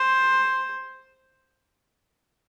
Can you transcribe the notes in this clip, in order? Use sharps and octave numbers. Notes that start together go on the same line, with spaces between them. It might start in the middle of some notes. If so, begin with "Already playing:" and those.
Already playing: C5